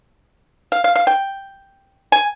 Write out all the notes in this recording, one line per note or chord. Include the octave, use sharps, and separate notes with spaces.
F5
F5
F5
G5
G#5